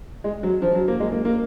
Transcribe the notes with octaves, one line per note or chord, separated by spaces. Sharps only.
G#3
F#3
F3
F#3
A#3
G#3
A#3
A#3